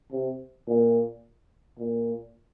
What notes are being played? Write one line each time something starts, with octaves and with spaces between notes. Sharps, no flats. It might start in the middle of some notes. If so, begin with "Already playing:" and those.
C3
A#2
A#2